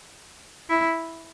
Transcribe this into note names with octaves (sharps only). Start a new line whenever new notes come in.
E4